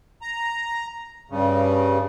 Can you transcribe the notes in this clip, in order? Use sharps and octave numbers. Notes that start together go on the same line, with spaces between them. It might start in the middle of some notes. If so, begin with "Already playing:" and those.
A#5
G2 C#3